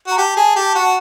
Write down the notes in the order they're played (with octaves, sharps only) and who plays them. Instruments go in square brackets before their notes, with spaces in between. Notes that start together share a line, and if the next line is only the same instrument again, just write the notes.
[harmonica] F#4 [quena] A#5
[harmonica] G4 [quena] A5
[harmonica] G#4
G4
F#4